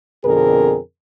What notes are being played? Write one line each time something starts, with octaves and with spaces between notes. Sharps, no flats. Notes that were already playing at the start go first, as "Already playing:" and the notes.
F2 B2 D3 C4 G#4 A#4